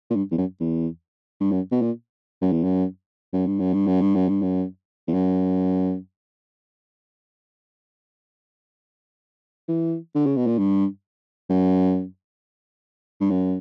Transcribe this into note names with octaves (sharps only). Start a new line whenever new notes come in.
A#2
G2
E2
F#2
E2
G2
F#2
B2
A#2
F#2
E2
F#2
F#2
G2
F#2
G2
F#2
G2
F#2
G2
F#2
E2
F#2
E3
D3
C#3
B2
A#2
G2
F#2
G2
F#2